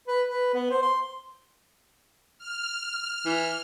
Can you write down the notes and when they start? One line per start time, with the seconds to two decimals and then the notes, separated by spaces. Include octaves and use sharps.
0.07 B4
0.27 B4
0.54 B3
0.71 C5
0.82 C6
2.38 F6
3.25 E3